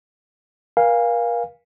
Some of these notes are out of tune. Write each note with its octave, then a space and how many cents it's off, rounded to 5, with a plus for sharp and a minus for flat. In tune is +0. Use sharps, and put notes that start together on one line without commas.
A#4 +40 F5 +0 G#5 -30